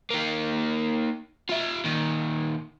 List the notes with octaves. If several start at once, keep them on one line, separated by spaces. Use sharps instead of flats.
D#3 A#3
F4 E5
A#2 D#3